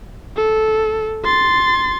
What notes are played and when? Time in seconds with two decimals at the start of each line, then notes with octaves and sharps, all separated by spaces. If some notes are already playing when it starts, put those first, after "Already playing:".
0.36 A4
1.24 C6 A6